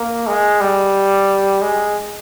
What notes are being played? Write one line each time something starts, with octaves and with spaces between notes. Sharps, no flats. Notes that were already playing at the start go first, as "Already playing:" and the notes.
Already playing: A#3
G#3
G3
G#3